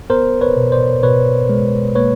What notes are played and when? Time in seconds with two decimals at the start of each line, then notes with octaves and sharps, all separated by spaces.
0.10 B3 A#4 C5
0.41 B4 C#5
0.57 B2
0.72 C5 D5
1.03 B2 B4 C#5
1.49 G#3
1.95 A#3 B4 C#5